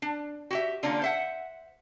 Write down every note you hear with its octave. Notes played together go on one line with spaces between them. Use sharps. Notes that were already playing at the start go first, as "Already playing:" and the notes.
D4
F#4 G4 E5
D3 A#3 C#4 D4 F4
C5 E5 F#5